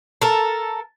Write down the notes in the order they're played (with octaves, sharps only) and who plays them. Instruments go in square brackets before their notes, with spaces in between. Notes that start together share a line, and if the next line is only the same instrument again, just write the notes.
[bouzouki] A4 A#4